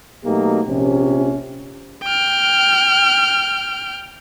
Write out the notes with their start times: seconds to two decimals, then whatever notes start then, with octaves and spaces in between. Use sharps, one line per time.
0.25 B2 F#3 A3 A#3 D#4 G4
0.67 A#1 C3 C#4
2.04 G5 F6